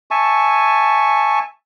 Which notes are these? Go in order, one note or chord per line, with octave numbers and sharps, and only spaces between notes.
E5 G#5 A5 C#6